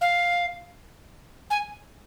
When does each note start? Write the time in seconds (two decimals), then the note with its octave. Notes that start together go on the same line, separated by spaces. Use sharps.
0.01 F5
1.50 G#5